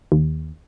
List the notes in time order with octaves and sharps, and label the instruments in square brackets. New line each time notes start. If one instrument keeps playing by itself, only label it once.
[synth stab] D#2